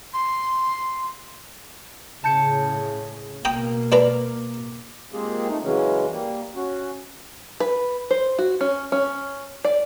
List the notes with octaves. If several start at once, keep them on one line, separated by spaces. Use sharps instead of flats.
C6
A2 C#3 A5 G6 C#7
B2 A#3 G5 A#5 D#6
D4 B4 A#5 D6
G#3 A#3 C4 F4 G4 G#4
A3 D#4
C#3 E3 F#3 G#3 C#4
G3 A#3
C#4 F#4
B4
C5
F#4
C#4
C#4
D5